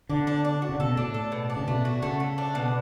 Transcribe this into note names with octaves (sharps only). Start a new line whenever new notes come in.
D3 D4
D4
D4
F#4
C#3
B2 A4
A2 D4
A4
B2
D4
C#3
B2 A3
F#4
C#3 A3
A3
D4
B2